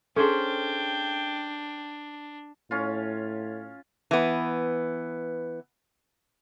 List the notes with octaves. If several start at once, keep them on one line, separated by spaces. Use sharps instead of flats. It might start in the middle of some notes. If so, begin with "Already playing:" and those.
C#4 D4 G#4 A4 C5 G5
A2 C#4 F4
E3 B3